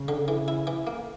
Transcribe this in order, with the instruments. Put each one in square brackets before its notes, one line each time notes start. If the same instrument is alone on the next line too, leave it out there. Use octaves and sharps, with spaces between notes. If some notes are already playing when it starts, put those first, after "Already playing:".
Already playing: [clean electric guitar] C#3
[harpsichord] D3
E3
E4
E3
A#3